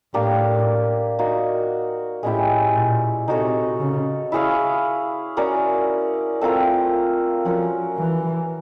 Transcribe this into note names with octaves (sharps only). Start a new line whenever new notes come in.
A2 A#3 D4 G4
A#3 D#4 F#4
A2 G#3 C#4 E4 G4
A#2
C3 D#4 F#4 A4 C#5
C#3
E4 G#4 C#5 F5
C#4 F#4 A#4 D5
A3 C4 F4 A#4
F3 C#4 F#4 A#4
E3